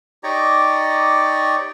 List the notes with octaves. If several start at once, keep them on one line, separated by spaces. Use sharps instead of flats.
D#4 G4 C#5 D5 A#5